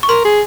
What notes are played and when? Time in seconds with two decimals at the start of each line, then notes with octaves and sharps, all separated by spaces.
0.03 C#6
0.09 A#4 C6
0.25 G#4